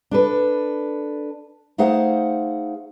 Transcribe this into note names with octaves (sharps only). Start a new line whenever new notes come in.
D4 A4 B4
A3 D#4 G#4 C5 F5 F#5